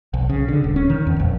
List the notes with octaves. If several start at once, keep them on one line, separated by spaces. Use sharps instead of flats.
B1
C#3
D3
D#1
C#4
D#3
E2
A#1